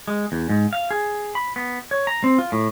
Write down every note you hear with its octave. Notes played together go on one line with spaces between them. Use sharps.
G#3
E2
G#2
F5
G#4
B5
B3
C#5
A#5
C4
F4
A2